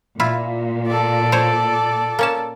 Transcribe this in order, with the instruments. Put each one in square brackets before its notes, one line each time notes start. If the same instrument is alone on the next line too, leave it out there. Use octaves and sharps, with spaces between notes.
[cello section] A#2 [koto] E4 F4
[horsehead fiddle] A4 D5
[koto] C5 C#5
A#3 C#4 A5